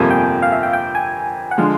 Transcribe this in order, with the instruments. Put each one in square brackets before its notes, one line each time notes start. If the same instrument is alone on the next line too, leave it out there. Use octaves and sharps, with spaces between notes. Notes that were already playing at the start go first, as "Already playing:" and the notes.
Already playing: [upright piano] G1 F2 C3 F3 A#3 [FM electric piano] G#5
[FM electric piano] G5
F5
E5
G5
G5
G#5
F#5
[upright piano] D3 F3 G#3 [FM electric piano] F5